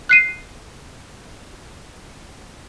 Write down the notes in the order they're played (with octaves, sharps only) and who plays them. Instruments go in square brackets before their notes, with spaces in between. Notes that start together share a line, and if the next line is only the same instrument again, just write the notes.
[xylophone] F#6 C7 D#7